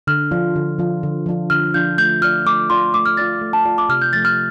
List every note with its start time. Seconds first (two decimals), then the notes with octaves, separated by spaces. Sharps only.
0.07 D3 F6
0.31 F3 D4 F4
0.55 D3
0.79 F3 D4 F4
1.03 D3
1.26 F3 D4 F4
1.50 D3 F6
1.74 F3 D4 F4 G6
1.98 A3 G6
2.22 F4 D5 F6
2.46 A3 D6
2.70 F4 D5 C6
2.94 A3 D6
3.06 F6
3.17 F4 D5 A6
3.41 A3
3.53 A5
3.65 F4 D5
3.78 D6
3.89 C3 F6
4.02 G6
4.13 F3 A3 A6
4.25 F6